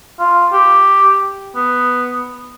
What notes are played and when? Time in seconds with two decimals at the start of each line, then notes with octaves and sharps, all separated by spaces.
0.20 F4
0.53 G4
1.56 B3